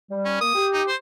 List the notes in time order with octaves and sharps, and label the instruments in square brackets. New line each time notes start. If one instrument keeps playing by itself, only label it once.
[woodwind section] G3
[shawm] C#4
[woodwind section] A#3 [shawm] D#6
[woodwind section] G4
[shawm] D#4
C5